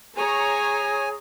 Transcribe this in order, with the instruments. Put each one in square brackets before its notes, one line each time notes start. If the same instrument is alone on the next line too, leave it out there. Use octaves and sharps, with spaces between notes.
[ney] G#4 [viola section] C#5 A#5 [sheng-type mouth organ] G#5